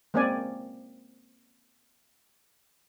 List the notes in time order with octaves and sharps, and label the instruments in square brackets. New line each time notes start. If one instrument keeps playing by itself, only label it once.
[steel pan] G#3 A#3 C4 C#4 D5 G#5